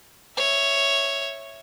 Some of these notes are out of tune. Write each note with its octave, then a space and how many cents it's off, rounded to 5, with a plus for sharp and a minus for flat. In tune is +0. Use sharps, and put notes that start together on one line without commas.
C#5 +0 E5 +0